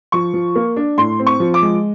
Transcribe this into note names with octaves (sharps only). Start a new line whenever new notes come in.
F3 C#6
F3
A#3
D4
A2 C6
C4
C#6
F3
D6
G#3